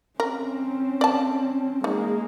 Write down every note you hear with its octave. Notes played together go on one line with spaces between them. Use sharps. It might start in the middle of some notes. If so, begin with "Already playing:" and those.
C4 C#4 A#4
D5 A5
G#3 A#3 D#4